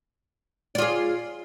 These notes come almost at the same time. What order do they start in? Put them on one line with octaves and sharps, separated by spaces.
D5 F4 G#4